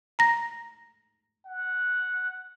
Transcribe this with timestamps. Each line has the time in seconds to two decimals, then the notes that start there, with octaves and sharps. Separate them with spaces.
0.19 A#5 A#6
1.46 F#5